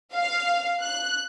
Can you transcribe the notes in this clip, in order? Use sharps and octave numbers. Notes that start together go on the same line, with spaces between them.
F5
F#6